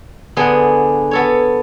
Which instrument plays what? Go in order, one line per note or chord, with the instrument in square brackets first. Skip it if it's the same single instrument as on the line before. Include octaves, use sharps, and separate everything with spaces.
[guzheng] D3 B3 D4 G#4 C6
B3 A4 C#5